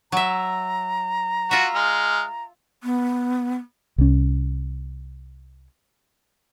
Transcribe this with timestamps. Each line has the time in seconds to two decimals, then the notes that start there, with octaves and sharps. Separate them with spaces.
0.12 F#3 E5 A#5
1.51 F4 F#4 E5
1.75 G#3 F6
2.83 B3
3.98 C2 C#4